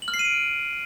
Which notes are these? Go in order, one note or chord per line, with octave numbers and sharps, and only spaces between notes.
F#7
F6
C7
D#7
D7